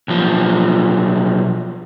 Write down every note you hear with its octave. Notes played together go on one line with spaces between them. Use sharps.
B1 F3